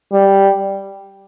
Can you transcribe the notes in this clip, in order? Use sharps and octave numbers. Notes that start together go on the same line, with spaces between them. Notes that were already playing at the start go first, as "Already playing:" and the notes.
G3